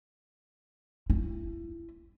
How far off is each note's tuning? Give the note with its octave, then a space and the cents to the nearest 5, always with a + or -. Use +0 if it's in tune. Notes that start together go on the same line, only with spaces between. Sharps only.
E4 +25